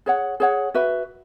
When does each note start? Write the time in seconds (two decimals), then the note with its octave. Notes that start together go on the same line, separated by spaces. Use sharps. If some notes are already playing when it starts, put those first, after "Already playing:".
0.06 G#4 C#5 F#5
0.40 G#4 C#5 F#5
0.74 F#4 B4 E5